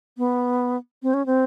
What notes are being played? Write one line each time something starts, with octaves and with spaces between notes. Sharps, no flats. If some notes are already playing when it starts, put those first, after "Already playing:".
B3
C4
C#4
C4